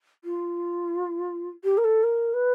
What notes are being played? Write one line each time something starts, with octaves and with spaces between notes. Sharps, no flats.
F4
G4
A#4
A4
A#4
B4